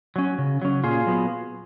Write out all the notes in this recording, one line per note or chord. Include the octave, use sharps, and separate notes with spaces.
F#3 C#4
C#3
F#3 C#4
A#2 F4 G#4
F#3 B3